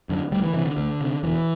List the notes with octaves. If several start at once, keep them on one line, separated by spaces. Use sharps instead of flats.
F#2 D3
D2 G3
E3
C3 E3
D3
D2
C3
E1 E3